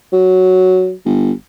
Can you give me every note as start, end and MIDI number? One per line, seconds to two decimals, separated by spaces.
0.13 0.92 54
1.06 1.31 31